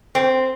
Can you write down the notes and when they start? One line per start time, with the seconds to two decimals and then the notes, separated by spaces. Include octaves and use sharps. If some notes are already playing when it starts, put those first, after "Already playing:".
0.15 C4